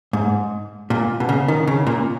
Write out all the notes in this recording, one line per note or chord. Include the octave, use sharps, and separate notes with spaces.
G#2
A#2
B2
C#3
D#3
C#3
A#2